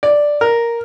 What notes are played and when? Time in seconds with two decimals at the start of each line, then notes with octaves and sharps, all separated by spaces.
0.03 D5
0.41 A#4